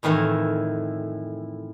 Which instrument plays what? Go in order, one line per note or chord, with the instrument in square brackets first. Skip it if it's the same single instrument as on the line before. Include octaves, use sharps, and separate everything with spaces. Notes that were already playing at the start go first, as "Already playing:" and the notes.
[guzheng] F2 A2 D#3 E3 C#5